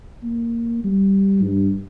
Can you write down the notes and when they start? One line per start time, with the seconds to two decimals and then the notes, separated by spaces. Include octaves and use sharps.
0.24 A#3
0.84 G3
1.43 G2